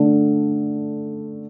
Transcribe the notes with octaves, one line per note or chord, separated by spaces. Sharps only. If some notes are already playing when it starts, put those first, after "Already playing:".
Already playing: D3 A3 D4